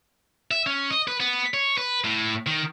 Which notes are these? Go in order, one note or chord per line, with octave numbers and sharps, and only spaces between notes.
E5
C#4
D#5
B4
B3
C#5
B4
A2
D#3